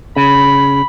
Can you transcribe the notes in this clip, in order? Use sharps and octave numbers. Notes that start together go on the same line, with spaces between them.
C#3 B5